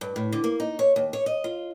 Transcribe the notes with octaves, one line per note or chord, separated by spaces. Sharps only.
G2
A2
D3
A#3
D#4
C#5
D#2
C#5
D#5
F4